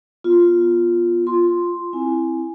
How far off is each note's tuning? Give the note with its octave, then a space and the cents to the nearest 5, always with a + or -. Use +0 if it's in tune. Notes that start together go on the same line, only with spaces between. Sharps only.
B3 -25 F4 +0
F4 +0 C6 +0
C4 +0 E4 +0 G#5 +0